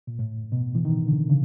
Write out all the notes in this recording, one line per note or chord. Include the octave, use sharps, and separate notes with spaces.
A#2
A2
B2
E3
D#3
D3
C#3